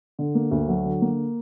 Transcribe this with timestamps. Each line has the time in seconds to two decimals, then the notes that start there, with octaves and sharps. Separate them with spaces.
0.19 D3
0.35 A#3
0.51 D2
0.68 F#3
0.85 D3
1.01 A#3